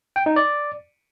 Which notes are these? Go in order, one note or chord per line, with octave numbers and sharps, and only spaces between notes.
G5
D#4
D5